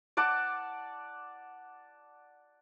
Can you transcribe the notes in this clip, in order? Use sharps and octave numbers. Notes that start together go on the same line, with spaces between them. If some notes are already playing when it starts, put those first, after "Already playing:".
D5 F#5 A5 D6